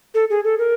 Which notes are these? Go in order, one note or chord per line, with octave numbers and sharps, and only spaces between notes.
A4
G#4
A4
A#4